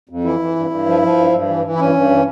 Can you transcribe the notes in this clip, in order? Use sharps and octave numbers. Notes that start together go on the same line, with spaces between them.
F2
E3 E4
E3
G2
G2
F3
F3
G2
G2
E3
E3
E4
G2 C#4
G2
E3